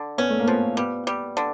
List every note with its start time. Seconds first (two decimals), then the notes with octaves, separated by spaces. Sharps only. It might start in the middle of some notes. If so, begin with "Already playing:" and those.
Already playing: D3
0.18 B3 C#4
0.30 A3
0.39 A#3
0.47 F3 B3
0.77 G3 B3
1.07 G3
1.37 D3